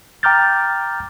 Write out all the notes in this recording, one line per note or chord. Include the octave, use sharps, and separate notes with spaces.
G5 A#5 D6 F6 G6 A6